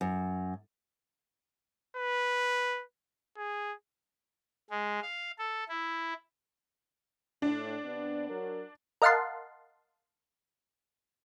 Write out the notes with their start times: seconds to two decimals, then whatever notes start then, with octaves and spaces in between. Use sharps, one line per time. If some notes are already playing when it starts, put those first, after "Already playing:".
0.01 F#2
1.97 B4
3.37 G#4
4.70 G#3
5.02 F5
5.39 A4
5.69 E4
7.42 A2 D4
7.85 C3 B3 D5
8.30 F#3 A#4
9.02 A#4 D#5 F5 F#5 A5 C6